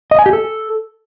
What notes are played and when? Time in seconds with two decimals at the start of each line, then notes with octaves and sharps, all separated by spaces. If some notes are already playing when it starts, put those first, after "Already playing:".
0.11 D#5
0.19 G#5
0.26 G4
0.33 A4